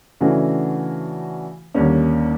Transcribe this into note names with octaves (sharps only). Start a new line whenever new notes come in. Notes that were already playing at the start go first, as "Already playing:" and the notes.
C#3 E3 A3 D4 F#4
D#2 D3 G3 A#3 C#4